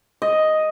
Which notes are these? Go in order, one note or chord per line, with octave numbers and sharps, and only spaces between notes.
D#5